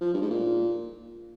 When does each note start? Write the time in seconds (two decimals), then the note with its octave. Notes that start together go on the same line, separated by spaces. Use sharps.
0.01 F3
0.14 G2
0.22 G#2
0.30 A#2